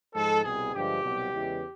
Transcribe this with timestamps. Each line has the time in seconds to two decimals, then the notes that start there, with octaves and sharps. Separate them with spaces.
0.13 G#2 F3 G#3 A4
0.43 C2 B2 G3 G#4
0.73 G2 D3 F3 G#3 G4
1.02 C2 B2 F#3
1.32 E2 C#3 E3 G#3